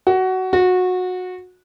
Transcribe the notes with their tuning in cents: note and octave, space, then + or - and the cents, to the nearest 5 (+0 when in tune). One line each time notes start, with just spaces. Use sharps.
F#4 +15
F#4 -20